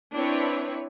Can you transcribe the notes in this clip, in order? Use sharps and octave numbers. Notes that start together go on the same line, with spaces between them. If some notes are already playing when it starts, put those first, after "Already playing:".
C4 D4 E4 B4 C#5